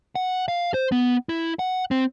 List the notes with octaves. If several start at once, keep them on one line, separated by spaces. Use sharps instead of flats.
F#5
F5
C5
B3
E4
F#5
C4